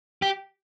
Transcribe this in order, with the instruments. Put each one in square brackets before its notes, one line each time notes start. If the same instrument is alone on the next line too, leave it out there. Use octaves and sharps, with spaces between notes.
[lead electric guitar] G4